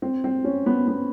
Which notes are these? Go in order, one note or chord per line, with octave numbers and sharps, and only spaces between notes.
C4
C4
C#4
B3
B3